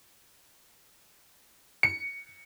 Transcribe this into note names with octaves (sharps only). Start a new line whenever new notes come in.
C#7